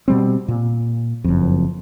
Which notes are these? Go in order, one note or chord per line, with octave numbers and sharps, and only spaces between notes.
B2 G3 C4
A#2
F#1 F2